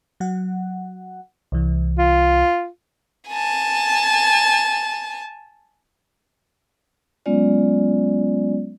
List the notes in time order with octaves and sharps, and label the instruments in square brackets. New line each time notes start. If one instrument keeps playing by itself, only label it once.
[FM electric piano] F#3 F#5
C2 E3
[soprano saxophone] F4
[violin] G#5 A5
[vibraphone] F#3 G#3 B3 C#4 F4 D5